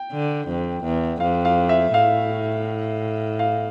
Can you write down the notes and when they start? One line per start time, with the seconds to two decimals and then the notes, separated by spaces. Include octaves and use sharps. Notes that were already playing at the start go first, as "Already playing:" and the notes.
Already playing: G5
0.12 D3
0.48 F2
0.84 E2
1.20 F2 F5
1.45 F5
1.69 E5
1.93 A2 F5
3.39 F5